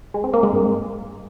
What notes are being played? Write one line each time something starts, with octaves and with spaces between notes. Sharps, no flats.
G#3
C4
A#3
G#3
G2